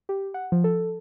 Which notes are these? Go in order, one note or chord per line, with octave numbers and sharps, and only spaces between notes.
G4
F#5
F3
A4